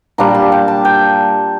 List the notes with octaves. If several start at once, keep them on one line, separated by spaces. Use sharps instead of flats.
A#2 G3 D4 F4 A#5
A5
G5
A5
G5